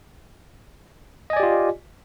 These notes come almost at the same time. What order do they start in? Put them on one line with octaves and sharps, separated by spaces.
D#5 G#5 D5 G4 F4